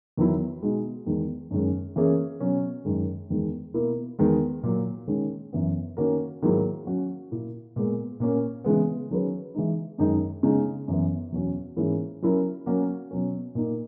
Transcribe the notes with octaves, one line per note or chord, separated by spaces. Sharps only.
E2 D#3 F#3 B3 E4
B2 G#3 D#4 F#4
E2 D#3 G#3 B3 D#4
F#2 D#3 G#3 C#4
E3 A#3 C#4 G#4
B2 F#3 C#4
F#2 D#3 G#3
E2 D#3 G#3
B2 A#3 E4 A#4
E2 D#3 G#3 B3
A#2 F#3 A#3
D#3 G#3 C#4
F#2 E3 B3
D#3 A#3 C#4 F#4 A#4
G#2 D#3 F#3 A#3 E4
F#3 C#4 F#4
A#2 A#3 E4
A#2 G#3 B3
A#2 A#3 C#4
C#3 E3 G#3 B3
D#3 F#3 C#4 G#4 B4
E3 G#3 D#4
F#2 D#3 G#3 D#4
C#3 G#3 D#4
F#2 E3 B3
E2 B2 F#3 C#4 F#4
G#2 E3 A#3 C#4 E4
F#3 C#4 E4 A#4
F#3 A#3 C#4 F#4 A#4
B2 F#3 C#4
A#2 A#3 D#4